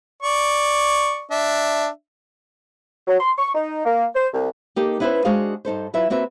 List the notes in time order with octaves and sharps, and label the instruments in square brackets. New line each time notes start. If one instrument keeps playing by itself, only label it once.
[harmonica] D5 C#6
D4 E5
[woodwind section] F#3
C6
C#6
D#4
A#3
C5
C2
[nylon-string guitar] A#3 D#4 G4 A4 A#4
B3 C#4 E4 G#4 B4 C5
G#3 D4 F#4 G#4 C5 F5
G2 D#4 A4 C5
F#3 E4 F4 B4 E5
A#3 C4 F#4 B4 E5